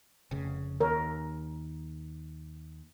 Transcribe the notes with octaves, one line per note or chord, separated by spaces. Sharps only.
F1 C#3
D#2 A#4 C#5